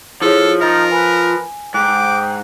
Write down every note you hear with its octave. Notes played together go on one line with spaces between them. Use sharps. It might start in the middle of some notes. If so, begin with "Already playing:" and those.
F3 E4 G#4 A4 C#5
D#4 A#4 F6 A6
B4 G#5
G#2 G5 D6 F#6